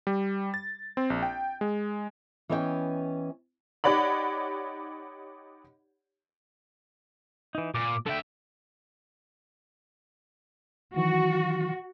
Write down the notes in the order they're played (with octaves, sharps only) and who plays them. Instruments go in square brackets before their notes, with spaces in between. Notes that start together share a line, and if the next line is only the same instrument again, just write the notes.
[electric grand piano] G3
A6
C4
A#1
G5
G#3
[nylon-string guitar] E3 B3 C#4 D#5 E5 G5
[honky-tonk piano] D#4 G4 C#5 D5 F#5 B5
[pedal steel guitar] E3 D#4
[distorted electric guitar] A#2 [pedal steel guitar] D6
[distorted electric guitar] D3 E5 [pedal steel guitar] A4 G5
[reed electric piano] D#3 E3 F#3 [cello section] F#4